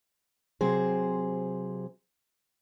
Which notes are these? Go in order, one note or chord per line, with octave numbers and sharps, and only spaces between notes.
C3 F#3 C4 G#4 C5